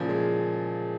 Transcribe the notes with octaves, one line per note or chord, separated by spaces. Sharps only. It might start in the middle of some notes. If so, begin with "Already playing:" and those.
Already playing: A#2 C#3 F3
G#3